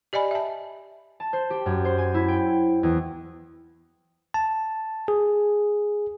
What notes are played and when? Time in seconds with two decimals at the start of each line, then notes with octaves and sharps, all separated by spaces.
0.13 G4 D5 D#5 G#5 B5
0.31 E5 A5
1.20 A5
1.33 C5
1.50 G4
1.66 F#2
1.85 C5
1.98 G#5
2.14 E4
2.28 G5
2.83 E2
4.34 A5
5.08 G#4